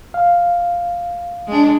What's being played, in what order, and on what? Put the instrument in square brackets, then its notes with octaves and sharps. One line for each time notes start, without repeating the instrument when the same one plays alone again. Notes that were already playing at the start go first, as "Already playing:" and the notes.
[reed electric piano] F5
[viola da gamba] G#3 D4